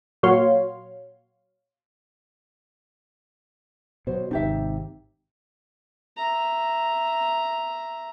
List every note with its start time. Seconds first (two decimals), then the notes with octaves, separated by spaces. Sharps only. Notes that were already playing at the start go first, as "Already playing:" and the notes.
0.23 A#2 F#3 F#4 C#5 F5 C6
4.07 B2 F#3 C5
4.31 G#1 C3 D#4 G4 E5
6.17 E5 A#5